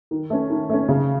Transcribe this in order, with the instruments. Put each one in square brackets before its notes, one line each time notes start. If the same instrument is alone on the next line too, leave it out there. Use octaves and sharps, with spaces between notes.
[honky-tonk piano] D#3
A3 C#4
D#3
A3 C#4
C#3